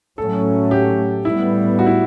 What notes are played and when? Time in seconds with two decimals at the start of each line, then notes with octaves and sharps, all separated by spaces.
0.18 A2 F#3 A3 C#4 A4
0.71 G4
1.25 A2 G3 B3 E4
1.79 F#4
1.86 E4